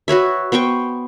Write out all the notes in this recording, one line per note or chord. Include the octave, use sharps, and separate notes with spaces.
F#4 B4 C#5 E5
B3 C5 G5 C#6